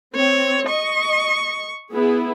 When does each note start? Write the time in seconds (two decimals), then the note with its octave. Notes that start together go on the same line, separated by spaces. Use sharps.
0.15 C4 C#5
0.68 D#5 C#6
1.93 B3 E4 G#4